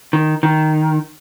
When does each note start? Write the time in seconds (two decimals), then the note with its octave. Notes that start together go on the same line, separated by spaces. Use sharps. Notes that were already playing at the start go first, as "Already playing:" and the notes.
0.13 D#3
0.43 D#3